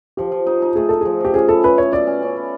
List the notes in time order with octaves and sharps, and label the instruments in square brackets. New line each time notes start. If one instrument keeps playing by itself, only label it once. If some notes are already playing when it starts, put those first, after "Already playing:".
[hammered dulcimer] F3 [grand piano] G4
[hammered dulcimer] F3
D#4
D#4
[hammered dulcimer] A3 [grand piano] G#4
[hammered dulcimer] D#4 [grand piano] A4
[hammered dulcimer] F3 [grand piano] G#4
[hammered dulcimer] F3 [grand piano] G4
[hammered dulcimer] C#4 [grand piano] G#4
[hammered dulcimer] E4 [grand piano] A4
[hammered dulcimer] C#4 [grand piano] B4
[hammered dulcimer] E4 [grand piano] C#5
[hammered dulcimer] B2 [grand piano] D5
[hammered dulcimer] C#4
C#4
E4